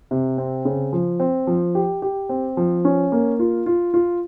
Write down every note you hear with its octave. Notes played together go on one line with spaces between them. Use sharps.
C3
C4
C#3
F3
C4
F3
G4
G4
C4
F3
C#4
A#3
F4
F4
F4